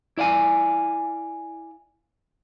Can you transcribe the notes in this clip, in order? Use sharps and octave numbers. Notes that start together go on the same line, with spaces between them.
E4 D5 F5 G#5